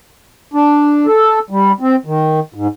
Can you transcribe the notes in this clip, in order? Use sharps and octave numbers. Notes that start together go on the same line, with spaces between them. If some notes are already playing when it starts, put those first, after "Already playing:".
D4
A4
G3
C4
D#3
G#2